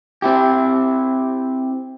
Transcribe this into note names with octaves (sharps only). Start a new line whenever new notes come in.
C4 E4 G4